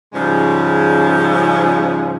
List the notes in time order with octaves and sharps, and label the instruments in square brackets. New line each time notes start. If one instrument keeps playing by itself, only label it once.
[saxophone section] G#2 C#3 F3 G3 G#3 C#4